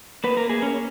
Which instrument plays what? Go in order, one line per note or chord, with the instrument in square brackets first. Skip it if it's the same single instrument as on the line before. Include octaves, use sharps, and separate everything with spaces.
[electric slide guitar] A#3 B4
A#4
A#3 G#4
C#4